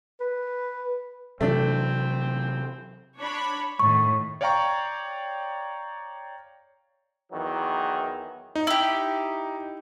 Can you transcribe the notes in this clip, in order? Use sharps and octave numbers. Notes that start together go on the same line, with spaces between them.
B4
C3 E3 F#3 A3 C4 D4
D4 C#5 B5
A2 D#3 C#6
C#5 D5 F5 G5 A#5 C#6
E2 D#3 E3 F#3
D#4
E4 G4